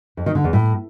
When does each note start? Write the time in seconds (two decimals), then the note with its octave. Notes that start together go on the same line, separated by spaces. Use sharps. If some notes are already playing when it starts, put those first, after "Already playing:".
0.17 F2
0.26 D#3
0.35 D3
0.44 E2
0.53 A2